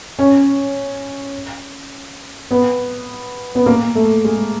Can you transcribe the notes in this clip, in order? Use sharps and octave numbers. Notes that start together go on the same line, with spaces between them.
C#4
B3
B3
A#3
A3
G#3